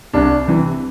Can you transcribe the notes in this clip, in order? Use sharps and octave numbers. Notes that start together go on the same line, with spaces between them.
C2 D4
C3 E3